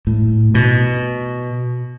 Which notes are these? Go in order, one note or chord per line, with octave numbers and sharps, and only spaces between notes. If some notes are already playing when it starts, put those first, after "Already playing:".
A2
B2